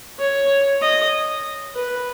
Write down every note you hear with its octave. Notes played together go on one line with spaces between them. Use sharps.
C#5
D#5
B4